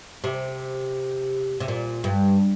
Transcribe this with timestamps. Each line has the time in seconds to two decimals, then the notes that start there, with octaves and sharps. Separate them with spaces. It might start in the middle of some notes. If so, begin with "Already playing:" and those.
0.24 C3
1.60 C3
1.68 A#2
2.04 G2